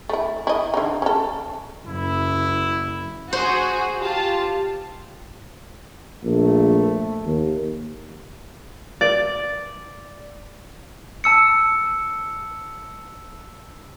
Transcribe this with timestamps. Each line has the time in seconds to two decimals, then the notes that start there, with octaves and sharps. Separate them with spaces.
0.09 A3 E4
0.47 E4 D#5
0.74 D3 D#4
1.02 C#4 A4
1.87 F#1 E4
3.33 F#4 G#4 C5
4.02 F4 G4 A5
6.24 A#1 A3
7.25 D#2
9.01 D5
11.24 A5 E6 C#7